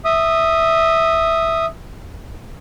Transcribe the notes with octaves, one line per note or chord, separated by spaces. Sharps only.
E5 D#6